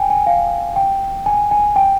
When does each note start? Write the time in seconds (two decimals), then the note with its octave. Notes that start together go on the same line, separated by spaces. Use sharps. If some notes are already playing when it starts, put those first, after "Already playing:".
Already playing: G5 G#5
0.10 G#5
0.27 F5
0.76 G5
1.26 G#5
1.51 G#5
1.76 G5